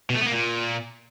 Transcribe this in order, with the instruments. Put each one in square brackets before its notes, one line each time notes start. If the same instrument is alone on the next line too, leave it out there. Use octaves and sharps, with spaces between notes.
[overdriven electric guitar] B2
A3
B3
A#3
A#2